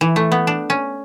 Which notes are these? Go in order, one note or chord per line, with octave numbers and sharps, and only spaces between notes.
E3
A3
B3
D4
C#4